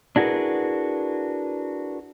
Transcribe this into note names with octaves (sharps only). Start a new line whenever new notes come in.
D4 E4 F#4 G#4 A#4 B4